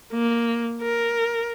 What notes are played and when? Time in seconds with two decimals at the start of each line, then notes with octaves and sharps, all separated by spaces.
0.12 A#3
0.82 A#4